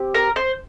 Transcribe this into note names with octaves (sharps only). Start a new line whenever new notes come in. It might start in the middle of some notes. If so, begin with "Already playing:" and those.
Already playing: C4 G4
A#4
C5